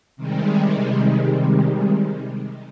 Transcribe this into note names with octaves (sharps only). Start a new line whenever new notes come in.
C3 D#3 G3 G#3